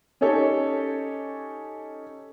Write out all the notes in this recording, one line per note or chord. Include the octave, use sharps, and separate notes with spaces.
C#4 D#4 G4 A4 C#5